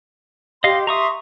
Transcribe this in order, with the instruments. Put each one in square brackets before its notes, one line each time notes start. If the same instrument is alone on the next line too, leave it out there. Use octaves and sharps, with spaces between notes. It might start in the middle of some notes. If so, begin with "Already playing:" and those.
[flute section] G4 C6 [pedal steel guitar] D#5 F5
[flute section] E5 C6 [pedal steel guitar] A#5 C#6 D#6